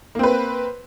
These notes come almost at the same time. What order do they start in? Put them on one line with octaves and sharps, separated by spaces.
A#3 C4 B4